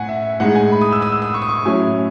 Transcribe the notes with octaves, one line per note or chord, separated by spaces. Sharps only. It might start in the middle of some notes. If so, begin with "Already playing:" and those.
Already playing: A2 F#5 G#5
E5
A2 G#3 D#4 F#5
G#5
B5
D#6
E6
D#6
E6
D#6
C#6
D#6
C#6
A2 F#3 C#4 E4 G#5